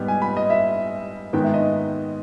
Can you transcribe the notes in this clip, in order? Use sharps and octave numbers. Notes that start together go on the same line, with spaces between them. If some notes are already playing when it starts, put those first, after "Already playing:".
Already playing: G#2 G3 B3
G#5
B5
D#5
E5
G#2 D#3 G#3 B3 D#4 G5
E5
D#5